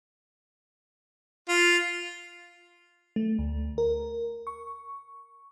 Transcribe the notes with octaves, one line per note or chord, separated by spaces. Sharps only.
F4
A3
D2
A#4
C#6